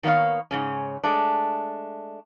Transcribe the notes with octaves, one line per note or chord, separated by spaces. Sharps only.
D#3 A#3 B3 C#5 F5
G#2 C#3 C#4
G#3 A3 D4